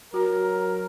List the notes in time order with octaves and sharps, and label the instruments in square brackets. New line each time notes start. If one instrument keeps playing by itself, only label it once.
[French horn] F#3 [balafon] F#4 [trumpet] A#4